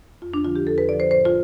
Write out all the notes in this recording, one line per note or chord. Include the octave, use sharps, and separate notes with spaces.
F2 F4
D4
D3 F3 F4
G4
F2 A4
B4
D3 F3 D5
C5
A2 C5
F4